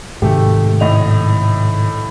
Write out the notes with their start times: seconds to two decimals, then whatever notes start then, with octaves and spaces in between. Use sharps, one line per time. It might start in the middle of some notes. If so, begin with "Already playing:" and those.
0.22 G#2 C3 D#3 A3 G4
0.80 A2 D#5 F7